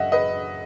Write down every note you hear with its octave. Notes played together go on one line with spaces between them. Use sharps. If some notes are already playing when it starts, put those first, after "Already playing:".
Already playing: F#2 C#3 D#5 E5 F#5
B4 D#5